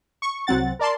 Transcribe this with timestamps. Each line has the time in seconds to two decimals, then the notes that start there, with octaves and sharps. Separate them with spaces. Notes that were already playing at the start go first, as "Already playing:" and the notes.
0.22 C#6
0.47 C2 F#3 C4 F#5 A6
0.79 A#4 D5 A5 C6